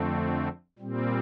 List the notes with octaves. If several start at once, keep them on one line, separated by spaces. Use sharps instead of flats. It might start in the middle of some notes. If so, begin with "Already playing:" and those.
Already playing: F2 D3 A3 C4
A#2 G3 C4